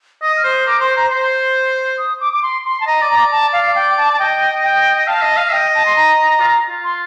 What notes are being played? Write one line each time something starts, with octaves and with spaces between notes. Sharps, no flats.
D#5 D#6
F6
C5
D#6
A#4 D6
C5 C6
C6
C5 A#5
C5 C6
D#6
D6
D6
C6
C6
A5
D#5 A#5
D5
A#5
D5
A5
F5
F5
G5
A5
A5
D#5 G5
G5
G5
F5 A5
D#5
F5
D#5 G5
A5
C6
A#5
F4
F4
C6